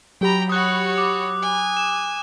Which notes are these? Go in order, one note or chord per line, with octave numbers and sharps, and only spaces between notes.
F#3 G4 G5 A#5 B5
F#4 C#5 D#6 F#6
D6
G#5
E7